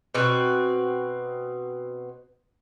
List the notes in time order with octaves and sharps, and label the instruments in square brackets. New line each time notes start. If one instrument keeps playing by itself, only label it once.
[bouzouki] B2 C4 F#4